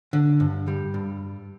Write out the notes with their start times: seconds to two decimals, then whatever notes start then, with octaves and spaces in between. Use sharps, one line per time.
0.13 D3
0.40 G2
0.68 G3
0.94 G2